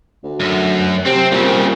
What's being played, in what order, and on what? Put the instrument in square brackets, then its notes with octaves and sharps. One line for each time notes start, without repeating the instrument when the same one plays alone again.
[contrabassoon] D2
[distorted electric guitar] F#2
[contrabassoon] C3 [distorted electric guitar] C4
[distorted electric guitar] C2 C#3 [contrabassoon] A#2